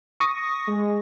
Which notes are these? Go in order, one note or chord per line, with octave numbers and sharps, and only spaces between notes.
C#6 D#6 A#6
G#3